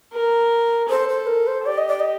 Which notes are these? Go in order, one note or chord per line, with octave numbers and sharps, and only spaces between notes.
A#4
A4 C5
C5
A#4
C5
G4 D5
D#5
D5
D#5